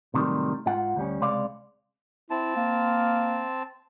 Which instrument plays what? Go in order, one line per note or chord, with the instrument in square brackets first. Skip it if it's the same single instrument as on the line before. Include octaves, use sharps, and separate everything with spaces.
[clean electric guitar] A2 C3 D#3 F#3 G3 A3
G#2 F4 F#5
D2 G3 C#4
C#2 C3 G#3 D5 F5
[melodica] C4 A5 [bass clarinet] E4
[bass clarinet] A#3